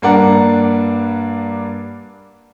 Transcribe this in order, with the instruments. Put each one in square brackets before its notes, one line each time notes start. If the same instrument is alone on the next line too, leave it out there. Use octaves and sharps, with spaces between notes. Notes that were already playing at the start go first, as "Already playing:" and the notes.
[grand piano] G2 A#3 D4 F#5